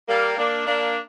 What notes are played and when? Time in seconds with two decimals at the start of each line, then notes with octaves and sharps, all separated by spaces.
0.08 G3 A#3
0.37 A#3 D4
0.66 A#3 D4